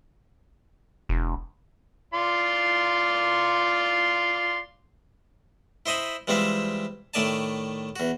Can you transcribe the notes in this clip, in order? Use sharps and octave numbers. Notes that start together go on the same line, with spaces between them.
E1
F4 D5 C6
E4 C5 D#5 G#5 B5
E3 G3 G#3 C4 F4 E5
A2 D#3 A3 D5 G#5 A5
E2 F#4